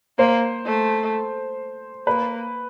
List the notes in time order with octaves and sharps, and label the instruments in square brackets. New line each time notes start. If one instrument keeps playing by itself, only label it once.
[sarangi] A#3 [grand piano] C5
[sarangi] A3
[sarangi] A#3 [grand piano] B4